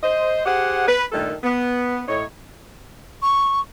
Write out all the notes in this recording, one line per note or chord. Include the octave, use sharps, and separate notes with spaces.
C5 D#5
G4 G#4 C5 F#5
B4
G2 A#2 D#3 G3 A3 A4
B3
A2 D#4 C#5
C#6